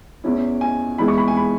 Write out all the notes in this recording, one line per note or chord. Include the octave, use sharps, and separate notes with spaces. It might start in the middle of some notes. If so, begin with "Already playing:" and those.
E2 E3 C#4 E4
G#5
E2 E3 G#3 E4 B5
C#6
B5
G#5
B5